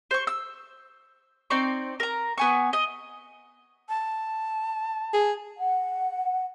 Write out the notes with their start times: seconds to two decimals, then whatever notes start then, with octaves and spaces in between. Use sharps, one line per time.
0.11 C5 C#6
0.27 E6
1.50 C4 D#4 D5 C#6
2.00 A#4 A#5
2.38 B3 G#5 C#6
2.73 D#5
3.89 A5
5.13 G#4
5.58 F#5